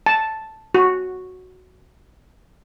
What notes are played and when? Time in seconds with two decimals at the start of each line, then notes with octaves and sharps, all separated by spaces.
0.06 A5
0.74 F#4